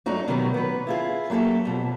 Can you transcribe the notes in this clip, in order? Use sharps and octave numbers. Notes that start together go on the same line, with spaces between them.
G2 F#3 A3 D4 D#4 F#4
B2 D#3 F#3 G3 B3 G4
B3 B4
E4 F4 G#4
F#3 A#3 G4 A4 E5
F2 B2